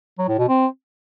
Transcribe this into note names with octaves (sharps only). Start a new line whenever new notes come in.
F#3
A2
B2
C4